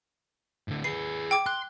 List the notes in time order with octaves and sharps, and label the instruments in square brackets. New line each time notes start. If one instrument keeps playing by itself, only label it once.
[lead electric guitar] A2 D3
[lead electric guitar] G#4 B4 [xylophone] C7
[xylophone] G5 D6
[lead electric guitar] C6 [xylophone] F#6